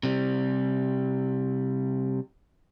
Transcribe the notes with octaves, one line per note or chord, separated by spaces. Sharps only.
C3 G3